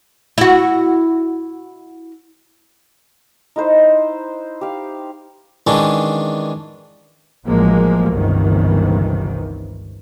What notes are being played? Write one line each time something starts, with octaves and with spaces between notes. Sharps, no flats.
E4 F#4
D#4 E4 B4 C5
G4 F5
D#3 E3 G#3 C#4 D4 E4
A1 F3 F#3 G#3 A#3
G1 C#2 C3 D#3 E3